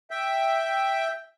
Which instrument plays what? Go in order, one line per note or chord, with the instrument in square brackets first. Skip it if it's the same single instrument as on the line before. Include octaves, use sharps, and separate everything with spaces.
[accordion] E5 G5